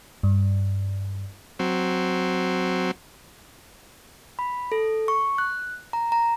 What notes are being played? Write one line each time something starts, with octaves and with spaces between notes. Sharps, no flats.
G2
F#3 C4
B5
A4
C#6
F#6
A#5
A#5